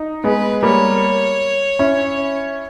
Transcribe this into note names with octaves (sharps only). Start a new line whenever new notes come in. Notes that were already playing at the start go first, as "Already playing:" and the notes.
Already playing: D#4
G#3 B3 B4
G3 A#3 C#5
C#4 E4